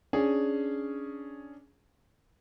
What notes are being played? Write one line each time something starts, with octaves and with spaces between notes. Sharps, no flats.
C#4 D4 G#4